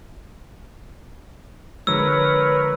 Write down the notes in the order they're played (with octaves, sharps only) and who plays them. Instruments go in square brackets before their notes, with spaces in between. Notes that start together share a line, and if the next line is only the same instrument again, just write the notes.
[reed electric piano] D3 F3 G#3 [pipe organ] A#4 B4 C#5 [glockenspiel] E6